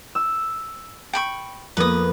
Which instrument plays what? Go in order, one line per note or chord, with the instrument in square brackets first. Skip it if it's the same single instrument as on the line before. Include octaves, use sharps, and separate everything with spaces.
[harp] E6
[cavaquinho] G5 B5 C#6
[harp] F2 A#3 B3 [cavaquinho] B4 D#6